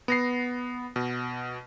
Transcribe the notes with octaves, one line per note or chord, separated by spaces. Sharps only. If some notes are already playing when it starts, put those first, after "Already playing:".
B3 A#6 C7
B2